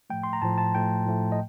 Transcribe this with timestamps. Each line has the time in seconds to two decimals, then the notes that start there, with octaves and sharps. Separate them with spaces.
0.10 A2 F3 A3 G5
0.23 C6
0.33 A#5
0.42 A2 F3 A3 A5
0.58 A5
0.75 A2 F3 A3 G5
1.06 A2 F3 A3
1.32 D#5